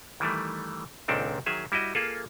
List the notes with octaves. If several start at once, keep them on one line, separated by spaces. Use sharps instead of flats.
D#3 E3 G3 A3
C#2 A#2 D#3 C4 D4 A4
D#3 F#3 G#4 E5
G3 E4 F#4 D#5
A#3 F4 G#4 A4